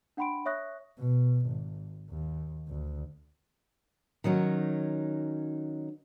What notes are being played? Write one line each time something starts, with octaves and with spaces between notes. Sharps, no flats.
D4 F#5 G5 B5 C6 D7
C#5 E5 C#6 D#6 F#6 A#6
B2
G#1
D#2
D2
D#3 F#3 C#4 D#4